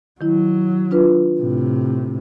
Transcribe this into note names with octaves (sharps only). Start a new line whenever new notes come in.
D#3 F#3 E4
D4 F4 B4
A2 C3